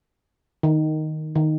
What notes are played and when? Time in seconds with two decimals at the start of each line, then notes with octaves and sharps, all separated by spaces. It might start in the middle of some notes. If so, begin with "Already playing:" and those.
0.63 D#3
1.35 D#3